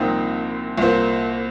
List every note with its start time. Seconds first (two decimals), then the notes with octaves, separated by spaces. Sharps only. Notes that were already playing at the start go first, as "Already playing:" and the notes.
Already playing: C2 A#2 F3 C4 D#4
0.78 C2 A#2 A#3 F4 C5